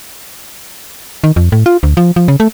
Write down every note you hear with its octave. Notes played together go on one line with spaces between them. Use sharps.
D#3
F2
A2
F4
D2
F3
F3
C#3
A3